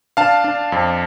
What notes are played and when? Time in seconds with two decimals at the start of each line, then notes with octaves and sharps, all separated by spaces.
0.17 D4 F5 A5
0.44 D4
0.72 F2